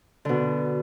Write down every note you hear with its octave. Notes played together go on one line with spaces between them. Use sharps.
B2 D3